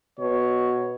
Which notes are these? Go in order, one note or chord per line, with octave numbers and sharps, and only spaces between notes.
B2 C#5